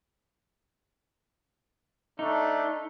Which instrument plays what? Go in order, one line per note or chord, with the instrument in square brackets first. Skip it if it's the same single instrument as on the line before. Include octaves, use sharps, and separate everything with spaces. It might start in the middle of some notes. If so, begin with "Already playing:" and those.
[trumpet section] A3 D4 [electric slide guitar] D#4